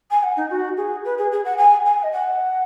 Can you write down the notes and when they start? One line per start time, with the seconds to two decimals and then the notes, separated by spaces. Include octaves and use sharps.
0.10 G#5
0.23 F#5
0.37 D#4
0.50 F#4
0.77 G#4
1.05 B4
1.18 G#4
1.31 G#4
1.44 F#5
1.57 G#5
1.85 G#5
2.02 D#5
2.12 F#5